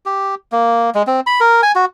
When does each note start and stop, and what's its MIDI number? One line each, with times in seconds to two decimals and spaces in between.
0.06 0.35 67
0.52 0.90 58
0.95 1.03 56
1.07 1.20 60
1.27 1.40 83
1.40 1.61 70
1.63 1.72 80
1.75 1.85 66